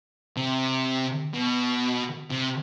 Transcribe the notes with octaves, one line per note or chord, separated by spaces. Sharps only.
C3
B2
C3